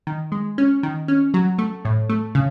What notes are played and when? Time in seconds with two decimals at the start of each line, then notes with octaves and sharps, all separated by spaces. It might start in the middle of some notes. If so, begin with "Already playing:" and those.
0.07 D#3
0.32 G#3
0.58 C#4
0.83 D#3
1.08 C#4
1.34 F#3
1.58 A3
1.85 A2
2.09 A3
2.35 C#3